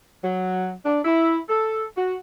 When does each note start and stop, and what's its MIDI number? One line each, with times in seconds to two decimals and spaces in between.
0.24 0.71 54
0.85 1.00 62
1.05 1.38 64
1.49 1.84 69
1.96 2.15 66